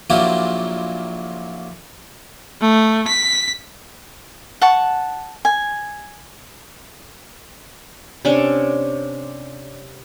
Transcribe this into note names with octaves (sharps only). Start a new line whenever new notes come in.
A#1 A#2 F#3 E4 F4 G4
A3
B6
F#5 A5 C#6
G#5
C3 C#4 D4